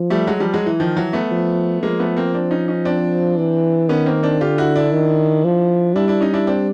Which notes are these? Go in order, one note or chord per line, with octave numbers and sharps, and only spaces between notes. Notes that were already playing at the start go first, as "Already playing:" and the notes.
Already playing: F3
G3 A3
F#3 G#3
F3 G3
F#3 G#3
E3
D#3 F3
E3 F#3
A3 B3
F3
F3 G#3 A#3
A3 B3
A#3 C4
C4 D4
C#4 D#4
C#4 D#4
C4 D4
E3
D#3 B3 C#4
A#3 C4
C4 D4
D3 F4 G4
E4 F#4
D4 E4
D#3
F3
G3 D4 E4
D4 E4
C#4 D#4
D4 E4
C4 D4